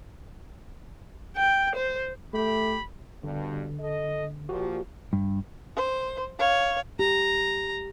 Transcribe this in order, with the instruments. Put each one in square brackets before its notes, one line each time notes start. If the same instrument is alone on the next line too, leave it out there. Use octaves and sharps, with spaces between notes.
[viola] G5
C5
[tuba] A3 [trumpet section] G4 B5
[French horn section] G2 B2 [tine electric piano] D3
[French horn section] A4 D#5
[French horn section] A#2 F3 [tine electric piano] F#4 G4
[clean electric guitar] G2
[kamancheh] C5
C#5 F5
[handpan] G4 [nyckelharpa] A#5